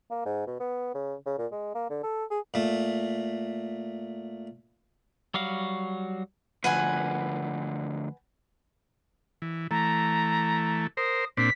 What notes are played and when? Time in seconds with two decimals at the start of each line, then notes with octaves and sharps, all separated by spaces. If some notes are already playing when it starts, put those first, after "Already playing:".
0.11 A#3
0.26 G#2
0.47 B2
0.60 B3
0.95 C#3
1.26 C#3
1.39 A#2
1.52 G#3
1.75 A#3
1.90 D3
2.03 A4
2.31 G#4
2.54 A#2 A3
5.34 F#3 G3 F#4 F5
6.64 D2 F3 B4 F#5 G#5
9.42 E3
9.71 E3 A3 A#5
10.97 A#4 C5 D#6
11.37 A#2 C4 D4 B6